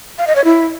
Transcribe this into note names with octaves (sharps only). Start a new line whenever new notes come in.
F5
D#5
C#5
E4